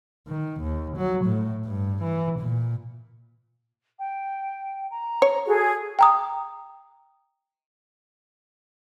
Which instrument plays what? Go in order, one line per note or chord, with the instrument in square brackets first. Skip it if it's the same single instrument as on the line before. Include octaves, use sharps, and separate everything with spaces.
[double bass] D#3
D#2
F#3
A2
G2
E3
A#2
[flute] G5
A#5
[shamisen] C#5
[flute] F#4 [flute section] G#4 A4
[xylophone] G5 A#5 D#6